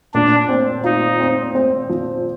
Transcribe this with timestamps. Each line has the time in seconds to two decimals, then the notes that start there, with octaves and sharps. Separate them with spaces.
0.14 A#2 D4
0.49 C4
0.84 D#4 F4
1.20 C4
1.55 C4
1.89 F3